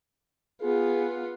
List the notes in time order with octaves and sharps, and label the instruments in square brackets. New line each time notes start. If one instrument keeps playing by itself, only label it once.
[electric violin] B3 F4 [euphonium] G#4